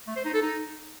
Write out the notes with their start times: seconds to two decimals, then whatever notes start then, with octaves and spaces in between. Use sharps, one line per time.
0.08 A3
0.16 C5
0.25 D#4
0.34 A4
0.42 D#4